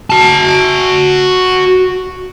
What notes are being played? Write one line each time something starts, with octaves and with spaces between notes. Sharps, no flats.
F#4 A5